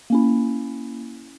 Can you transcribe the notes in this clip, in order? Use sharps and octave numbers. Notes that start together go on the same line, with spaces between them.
A#3 C#4 E4